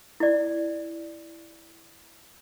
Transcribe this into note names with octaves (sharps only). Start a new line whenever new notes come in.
E4 D5